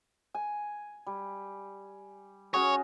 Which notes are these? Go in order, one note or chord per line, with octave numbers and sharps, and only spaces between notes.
G#5
G3
C#4 F#4 G#4 C#5